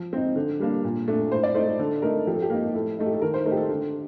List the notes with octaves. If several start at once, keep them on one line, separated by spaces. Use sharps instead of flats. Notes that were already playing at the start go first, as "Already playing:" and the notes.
Already playing: F3
C4 D#4
D3
G3 A#3 D4
A#2
A3 D4
A2 C5
D5
A3 D#4 C5
A4
D3 A4
A3 D#4 A#4
F3 G4
A4
G4
A#3 D#4
A2 A4
A3 D#4
G4
A4
D#3 A#4
C5
A3 D#4 A#4
G4
A4
D3